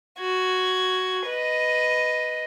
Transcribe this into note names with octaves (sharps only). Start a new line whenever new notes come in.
F#4 G#6
B4 D#5